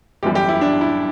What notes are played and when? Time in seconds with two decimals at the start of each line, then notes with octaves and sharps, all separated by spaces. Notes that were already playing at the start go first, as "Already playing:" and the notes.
0.23 G1 F#2 E3 G3 G4
0.35 G4
0.49 E4
0.61 D4
0.81 E4